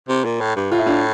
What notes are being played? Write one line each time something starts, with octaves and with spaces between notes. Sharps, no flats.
C3
A#2
A2
G2
A2 F4
E4
D4 F4